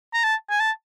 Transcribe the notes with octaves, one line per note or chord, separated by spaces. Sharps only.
A#5
A5
G#5
A5